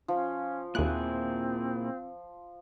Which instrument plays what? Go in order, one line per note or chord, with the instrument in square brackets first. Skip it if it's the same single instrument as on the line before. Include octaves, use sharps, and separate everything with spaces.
[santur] F3 [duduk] C#4
[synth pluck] D#2 F#6 [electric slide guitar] A#2 E4 G#4 [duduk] C4